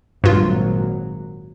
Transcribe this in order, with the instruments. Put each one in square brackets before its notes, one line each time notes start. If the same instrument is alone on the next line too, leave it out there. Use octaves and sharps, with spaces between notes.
[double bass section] G#1 A#2 F#3 [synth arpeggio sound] G2 F4